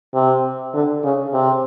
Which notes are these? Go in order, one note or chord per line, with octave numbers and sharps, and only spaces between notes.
C3
D3
C#3
C3